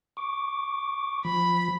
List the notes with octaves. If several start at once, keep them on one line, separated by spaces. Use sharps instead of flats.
C#6 D6
F3 B5